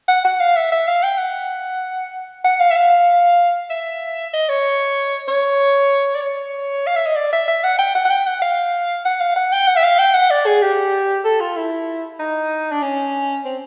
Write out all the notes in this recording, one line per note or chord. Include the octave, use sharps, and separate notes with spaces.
F#5
F#5
F5
E5
E5
F5
G5
F#5
F#5
F5
E5
F5
E5
D#5
C#5
C#5
D5
C#5
F5
E5
D#5
D5
E5
E5
F#5
G5
F#5
F#5
G5
F#5
F5
F#5
F5
F#5
G5
F#5
E5
F5
G5
F#5
D5
G#4
G4
A4
F4
E4
D#4
D4
C#4
C4